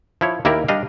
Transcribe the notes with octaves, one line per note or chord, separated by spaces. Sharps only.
F3 E4 C#5
D#2 A#3 E4 G4 A#4 D5
G3 D4 D#5 F5